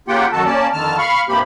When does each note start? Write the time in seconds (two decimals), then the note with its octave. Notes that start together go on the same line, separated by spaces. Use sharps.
0.08 C#3 A#3 F4 G4 F#5 G5
0.32 F#2 D#3 F#4 A4 A5
0.45 A#3 C#4 D5 A5
0.73 F2 D3 D#3 A5 F6
0.98 F5 B5 C#6 F6
1.29 G2 C3 F3 A#3 G4 B5